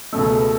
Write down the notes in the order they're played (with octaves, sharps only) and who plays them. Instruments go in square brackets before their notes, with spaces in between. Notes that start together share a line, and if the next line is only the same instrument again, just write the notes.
[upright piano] C#2 B2 A3 E6